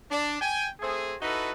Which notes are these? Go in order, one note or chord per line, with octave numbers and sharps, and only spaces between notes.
D4
G5 G#5
A3 C4 G#4
D#4 E4 F#4 A4 B4